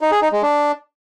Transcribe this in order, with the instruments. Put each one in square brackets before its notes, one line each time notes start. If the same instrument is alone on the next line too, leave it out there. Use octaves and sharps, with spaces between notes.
[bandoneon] D#4
G#4
D#4
G#3
D4